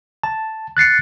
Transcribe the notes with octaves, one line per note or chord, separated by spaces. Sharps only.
A5
F#6 A6 C7 C#7